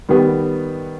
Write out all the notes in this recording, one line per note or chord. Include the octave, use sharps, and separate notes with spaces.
D#3 G3 B3